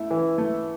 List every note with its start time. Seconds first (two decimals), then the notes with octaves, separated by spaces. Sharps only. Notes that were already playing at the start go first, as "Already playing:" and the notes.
Already playing: A3 E4
0.11 E3
0.38 A3